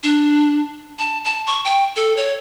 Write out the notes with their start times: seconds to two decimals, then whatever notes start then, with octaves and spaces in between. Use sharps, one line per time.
0.03 D4
0.99 A5
1.25 A5
1.47 C#6
1.65 G5
1.96 A4
2.17 C#5